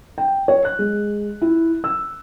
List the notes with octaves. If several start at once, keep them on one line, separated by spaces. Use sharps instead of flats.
G5
C#5
F#6
G#3
E4
E6